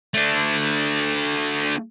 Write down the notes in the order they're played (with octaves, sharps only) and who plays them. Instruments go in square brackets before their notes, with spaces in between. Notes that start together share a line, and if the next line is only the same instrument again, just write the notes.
[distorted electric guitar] A3 D4